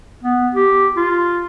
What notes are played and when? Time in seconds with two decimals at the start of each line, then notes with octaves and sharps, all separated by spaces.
0.23 B3
0.55 G4
0.97 F4